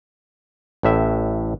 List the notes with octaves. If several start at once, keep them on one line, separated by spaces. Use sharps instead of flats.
A1 A2 E5